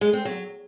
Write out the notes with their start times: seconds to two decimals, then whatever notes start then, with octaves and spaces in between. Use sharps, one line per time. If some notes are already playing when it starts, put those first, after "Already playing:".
0.01 G#3
0.13 C4
0.25 F#3